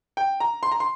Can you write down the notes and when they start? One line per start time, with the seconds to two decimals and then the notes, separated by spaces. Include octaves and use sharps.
0.17 G5
0.40 A#5
0.63 C6
0.72 A#5
0.80 C6